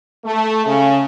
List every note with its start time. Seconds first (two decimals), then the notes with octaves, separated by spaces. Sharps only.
0.25 A3
0.66 C#3